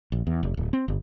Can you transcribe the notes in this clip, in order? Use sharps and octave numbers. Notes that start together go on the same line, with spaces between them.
A#1
E2
F1
D1
C4
G1